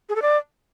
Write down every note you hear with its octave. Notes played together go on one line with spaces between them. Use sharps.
G#4
A4
D5